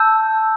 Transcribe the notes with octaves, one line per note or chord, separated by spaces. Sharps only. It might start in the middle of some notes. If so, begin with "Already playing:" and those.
Already playing: A5 E6 G6